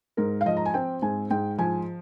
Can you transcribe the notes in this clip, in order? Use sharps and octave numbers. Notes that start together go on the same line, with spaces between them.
G#2 A#4
F5
F3 D#5
A#5
G#5
C4 G5
G#2 G#5
G#2 G5
F3 G#5